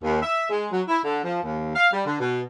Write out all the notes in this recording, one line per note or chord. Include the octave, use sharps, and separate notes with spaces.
D#2
E5
G#3
F#3
E4
D3
F3
D#2
F5
G3
D3
B2